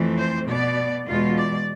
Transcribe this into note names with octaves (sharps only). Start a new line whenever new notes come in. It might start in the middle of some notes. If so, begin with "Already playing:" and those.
Already playing: F2 E3 A3 C4
C5
B2 B3 D5
E2 B2 G#3 F4
D5